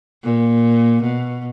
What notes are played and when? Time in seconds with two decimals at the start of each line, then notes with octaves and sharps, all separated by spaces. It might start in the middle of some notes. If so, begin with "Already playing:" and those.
0.24 A#2
1.03 B2